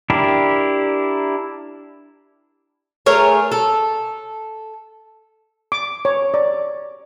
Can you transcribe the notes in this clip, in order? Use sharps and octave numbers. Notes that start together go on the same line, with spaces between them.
D4 E4 G4 A#4
A3 G#4 A#4 C#5
A4
D6
C#5
D5